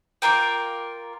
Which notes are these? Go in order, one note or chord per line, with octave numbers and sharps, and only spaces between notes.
A#3 F4 A#4 G5